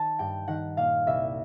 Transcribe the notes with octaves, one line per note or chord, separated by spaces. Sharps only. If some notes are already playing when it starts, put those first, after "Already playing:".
Already playing: D#3 A5
G2 G5
D#3 F#5
A#2 F5
C2 E5